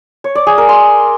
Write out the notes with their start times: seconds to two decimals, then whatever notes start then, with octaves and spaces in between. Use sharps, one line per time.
0.24 C#5
0.35 D5
0.47 G#4
0.58 A#4
0.69 C6